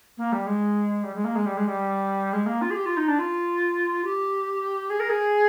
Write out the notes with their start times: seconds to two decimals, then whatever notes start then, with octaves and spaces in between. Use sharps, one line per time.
0.18 A#3
0.32 G3
0.46 G#3
1.03 G3
1.15 G#3
1.24 A#3
1.35 G#3
1.46 G3
1.57 G#3
1.67 G3
2.33 G#3
2.46 A#3
2.62 F4
2.70 G#4
2.75 G4
2.86 F4
2.97 D#4
3.08 D4
3.19 F4
4.04 G4
4.90 G#4
5.00 A#4
5.09 G#4